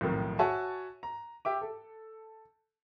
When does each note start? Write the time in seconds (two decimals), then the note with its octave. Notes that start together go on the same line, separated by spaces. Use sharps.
0.01 B1 F2 A2 D#3
0.39 F#4 C#5 E5 G#5 A5
1.03 A#5
1.45 G4 E5 D6
1.61 A4